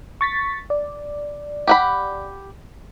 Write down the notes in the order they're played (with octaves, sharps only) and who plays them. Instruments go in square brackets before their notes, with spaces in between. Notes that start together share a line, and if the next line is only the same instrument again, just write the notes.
[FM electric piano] C#6 A6 B6
D5
[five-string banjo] G4 F#5 B5